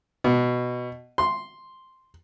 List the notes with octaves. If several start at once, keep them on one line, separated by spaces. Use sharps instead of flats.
B2
C6